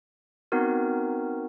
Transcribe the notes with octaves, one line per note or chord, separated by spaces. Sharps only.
B3 C4 D#4 F#4 A#4